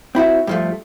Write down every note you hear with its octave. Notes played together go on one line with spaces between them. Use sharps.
C4 E4 F#4 E5
G2 F3 A3